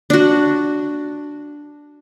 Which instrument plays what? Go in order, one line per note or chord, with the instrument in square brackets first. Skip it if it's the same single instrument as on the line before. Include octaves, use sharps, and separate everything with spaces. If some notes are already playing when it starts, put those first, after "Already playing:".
[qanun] D4 F#4